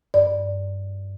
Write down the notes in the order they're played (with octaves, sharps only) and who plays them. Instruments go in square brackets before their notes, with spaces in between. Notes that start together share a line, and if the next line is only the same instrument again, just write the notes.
[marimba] G2 D5